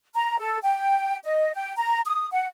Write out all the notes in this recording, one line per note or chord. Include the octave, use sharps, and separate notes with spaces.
A#5
A4
G5
D#5
G5
A#5
D#6
F#5